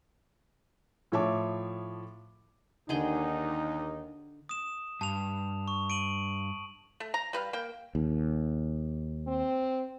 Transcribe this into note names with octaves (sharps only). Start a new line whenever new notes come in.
A2 F3 C#5 E5 A5 D6
D#2 D3 D#4 G#4 G5
D#6 E7
G2 A5 F7
C#6
D7 D#7 F#7
A3
A#5
G3 B4 F5
A#3 G5
D#2
C4